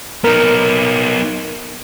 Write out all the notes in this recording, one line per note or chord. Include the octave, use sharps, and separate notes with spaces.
B3 D#4 A#4